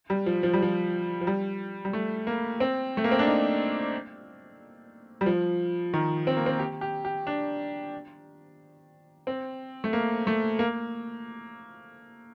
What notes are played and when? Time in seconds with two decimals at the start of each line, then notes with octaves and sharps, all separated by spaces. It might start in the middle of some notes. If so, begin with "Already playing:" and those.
0.10 G3
0.26 F3
0.43 F3
0.54 G3
0.62 F3
1.21 F3
1.27 G3
1.85 G3
1.93 A3
2.27 A#3
2.60 C4
2.97 A3
3.04 A#3
3.11 C4
3.19 D4
3.27 D#4
5.21 G3
5.26 F3
5.94 D#3
6.27 C4
6.37 A#3
6.46 C4
6.59 G4
6.81 G4
7.05 G4
7.27 D4
9.27 C4
9.84 A3
9.93 A#3
10.27 A3
10.59 A#3